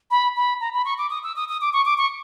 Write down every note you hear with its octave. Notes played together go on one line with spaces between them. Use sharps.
B5
B5
A#5
B5
C#6
D6
D#6
E6
D#6
D#6
D6
C#6
D6
C#6